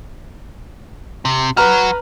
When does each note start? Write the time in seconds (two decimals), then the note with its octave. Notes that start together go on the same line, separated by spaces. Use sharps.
1.25 C3
1.57 F#3 F#4 B4 A#5 F6